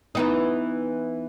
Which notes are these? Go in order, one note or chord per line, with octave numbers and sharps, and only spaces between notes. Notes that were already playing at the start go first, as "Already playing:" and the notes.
E3 B3 D#4